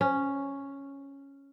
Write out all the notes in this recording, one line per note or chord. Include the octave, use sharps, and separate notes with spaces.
C#4